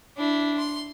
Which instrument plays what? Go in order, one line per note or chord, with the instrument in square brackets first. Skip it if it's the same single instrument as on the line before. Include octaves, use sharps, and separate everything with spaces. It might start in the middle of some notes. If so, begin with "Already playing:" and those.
[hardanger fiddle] D4 E4
C6